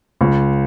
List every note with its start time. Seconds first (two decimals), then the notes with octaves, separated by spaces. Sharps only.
0.21 C#2